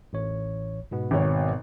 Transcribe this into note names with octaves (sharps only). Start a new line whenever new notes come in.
A1 C#5
G#2 B2 B3
G#1 C#5